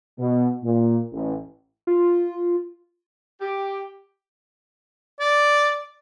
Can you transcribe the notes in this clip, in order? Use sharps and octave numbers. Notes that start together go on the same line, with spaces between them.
B2
A#2
A1
F4
G4
D5